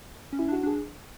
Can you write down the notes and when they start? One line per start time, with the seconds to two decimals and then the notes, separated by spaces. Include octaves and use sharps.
0.33 C#4
0.39 E4
0.48 D4 F#4
0.63 D4 G#4